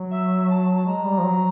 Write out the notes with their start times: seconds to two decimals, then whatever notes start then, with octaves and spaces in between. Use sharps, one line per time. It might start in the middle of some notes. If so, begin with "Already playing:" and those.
Already playing: F#3
0.10 E5
0.49 A5
0.86 G#3 A#5
1.05 G3
1.18 F3
1.25 F#3